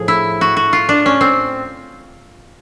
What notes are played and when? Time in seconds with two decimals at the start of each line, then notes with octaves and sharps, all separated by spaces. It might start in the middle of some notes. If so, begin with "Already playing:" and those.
Already playing: A2 F3 G#4
0.08 E4
0.41 F#4
0.57 F#4
0.73 F4
0.89 D4
1.06 C#4
1.21 C4